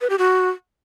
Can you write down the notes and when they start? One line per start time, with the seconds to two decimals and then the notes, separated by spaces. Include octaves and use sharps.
0.01 B4
0.10 G4
0.19 F#4